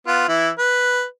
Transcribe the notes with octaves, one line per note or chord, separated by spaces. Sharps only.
B3 F4
E3 E4
B4